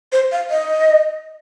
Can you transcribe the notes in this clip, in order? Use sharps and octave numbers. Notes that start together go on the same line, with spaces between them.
C5
F5
D#5